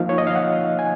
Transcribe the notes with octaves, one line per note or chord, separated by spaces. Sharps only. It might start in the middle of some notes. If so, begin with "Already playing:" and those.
Already playing: F3 A#3 D#4 F5
C#5
D#5
F5
F#5
G#5